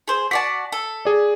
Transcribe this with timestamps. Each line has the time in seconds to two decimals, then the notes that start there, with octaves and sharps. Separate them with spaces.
0.08 G#4 C5
0.31 F#4 D5 A5 B6
0.72 A4
1.05 G#4 D5